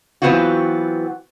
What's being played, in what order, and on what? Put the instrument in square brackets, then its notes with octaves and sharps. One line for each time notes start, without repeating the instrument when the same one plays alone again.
[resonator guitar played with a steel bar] E3 F#3 B3 C4 F4 F#4